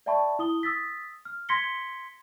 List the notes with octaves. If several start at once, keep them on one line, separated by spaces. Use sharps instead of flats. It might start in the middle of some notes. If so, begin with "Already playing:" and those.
D5 E5 G5 A5 B5 C#6
E4 D#6 G7
D#6 E6 A6 B6
F6
C6 G#6 A#6 B6 C#7 G7